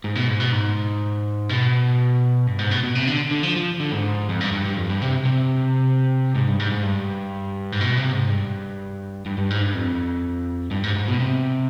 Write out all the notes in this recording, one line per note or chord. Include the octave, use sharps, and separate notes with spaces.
G#2
B2
G#2
B2
G#2
B2
G2
G#2
B2
B2
C3
D3
D3
F3
F3
D3
G#2
F2
G2
G2
G2
F2
G2
C3
C3
G#2
G2
G#2
G#2
G2
G#2
B2
C3
G#2
G2
G2
G2
G#2
G2
F2
G2
G#2
G#2
B2
C3